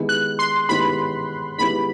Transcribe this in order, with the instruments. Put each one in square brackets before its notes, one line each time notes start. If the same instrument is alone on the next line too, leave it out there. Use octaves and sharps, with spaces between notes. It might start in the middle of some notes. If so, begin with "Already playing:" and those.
Already playing: [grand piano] D#3 G#3 B3 E4 G4
[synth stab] F#6
C6
[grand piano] D#3 G#3 B3 E4 G4 [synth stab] B5
[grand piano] D#3 G#3 B3 E4 G4 [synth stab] B5